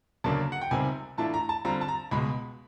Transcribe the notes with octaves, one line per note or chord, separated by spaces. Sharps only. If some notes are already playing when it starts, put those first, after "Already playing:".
D2 C#3 F#3 A#3 D4 A5
F#5
G5
C#2 C3 D#3 G3 C4 G#5
A2 E3 A3 D4 F4 A5
A#5
A5
D3 G3 C4 F4 A#5
A5
A#5
C#2 B2 G#3 B5